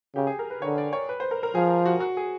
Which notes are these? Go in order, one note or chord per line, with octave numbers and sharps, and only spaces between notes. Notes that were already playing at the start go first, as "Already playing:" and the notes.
C#3 G4
G#4
A#4
B4
D3 C#5
D5
C#5
B4
C5
A#4
A#4
F3 G#4
F#4
F#4
G#4